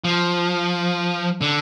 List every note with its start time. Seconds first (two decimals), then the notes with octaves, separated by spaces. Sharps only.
0.04 F3
1.42 D3